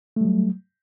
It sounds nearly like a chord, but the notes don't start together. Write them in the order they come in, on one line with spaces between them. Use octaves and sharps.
A3 G3 F#3